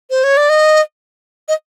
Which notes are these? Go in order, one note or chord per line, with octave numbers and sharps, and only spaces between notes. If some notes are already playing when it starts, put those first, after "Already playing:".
C5
C#5
D5
D#5
D#5